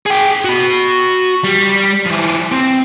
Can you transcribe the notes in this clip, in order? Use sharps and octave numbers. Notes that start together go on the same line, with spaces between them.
G#4 G5
F#4 B5
G3
F3 E4
C4